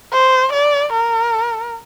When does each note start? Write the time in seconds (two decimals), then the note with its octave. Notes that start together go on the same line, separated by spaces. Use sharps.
0.13 C5
0.53 D5
0.93 A#4